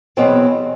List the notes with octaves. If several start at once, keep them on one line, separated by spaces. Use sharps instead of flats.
E2 B2 F#3 C4